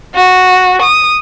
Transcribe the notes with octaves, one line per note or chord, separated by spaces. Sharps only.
F#4
D#6